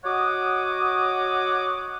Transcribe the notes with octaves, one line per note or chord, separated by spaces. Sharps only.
F#4 C#5 D#5 F#5 D6 D#6